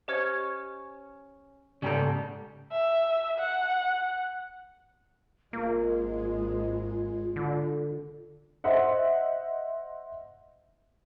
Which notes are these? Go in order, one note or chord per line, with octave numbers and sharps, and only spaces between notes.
C#4 G4 C5 C#5 D#5
D#2 G#2 C#3 G3 B3 A4 G5 A#5
E5
F#5
G#1 G#3 A#3 F4
D3
C5 D#5 E5 F#5